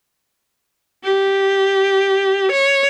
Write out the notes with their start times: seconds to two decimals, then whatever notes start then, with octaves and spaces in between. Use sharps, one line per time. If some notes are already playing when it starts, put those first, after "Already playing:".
1.04 G4
2.51 C#5